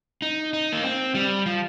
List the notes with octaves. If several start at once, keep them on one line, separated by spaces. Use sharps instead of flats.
D#4
D#4
A#3
C4
G3
F3